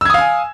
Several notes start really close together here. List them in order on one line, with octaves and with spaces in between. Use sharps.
E6 G#6 D#6 F5 G#5